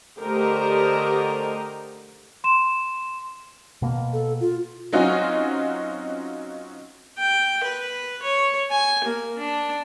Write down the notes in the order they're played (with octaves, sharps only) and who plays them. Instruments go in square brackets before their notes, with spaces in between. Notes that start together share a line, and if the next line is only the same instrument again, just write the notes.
[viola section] D3 A3 G4 A#4 C5 D#5
[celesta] C6 E7
[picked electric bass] B2 A#3
[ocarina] A4
F4
[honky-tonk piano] F#3 C4 C#4 D#4 F4 F#4
[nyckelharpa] G5
B4
C#5
G#5
A#3
D4